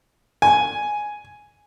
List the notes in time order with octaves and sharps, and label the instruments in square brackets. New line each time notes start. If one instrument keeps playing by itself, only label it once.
[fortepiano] G#5